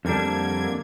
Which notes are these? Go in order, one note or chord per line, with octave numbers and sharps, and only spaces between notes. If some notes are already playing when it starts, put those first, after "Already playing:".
F2 D3 G3 A#3 D4 G#6